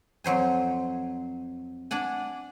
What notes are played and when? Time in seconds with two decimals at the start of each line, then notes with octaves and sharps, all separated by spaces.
0.24 F2 F#3 C5 G#5
1.91 D4 D5 F#5 G#5